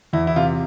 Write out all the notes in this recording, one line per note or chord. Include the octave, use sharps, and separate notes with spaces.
E2 E4
E4
C3 F4